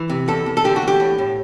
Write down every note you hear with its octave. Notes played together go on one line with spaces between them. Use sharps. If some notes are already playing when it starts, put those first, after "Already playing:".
Already playing: E3
C3
E2 A4
E2
A4
D3 G4
F#4
E2
G4
A2
A2